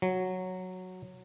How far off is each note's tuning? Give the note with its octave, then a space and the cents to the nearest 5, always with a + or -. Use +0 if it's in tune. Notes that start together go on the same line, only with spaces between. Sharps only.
F#3 -5